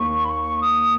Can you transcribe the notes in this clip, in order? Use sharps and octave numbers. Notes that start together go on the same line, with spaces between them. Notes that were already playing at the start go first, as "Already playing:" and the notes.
Already playing: D#2 C#6
B5
C#6
D#6